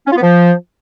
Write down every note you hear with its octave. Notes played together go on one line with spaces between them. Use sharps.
C#4
F4
B3
F3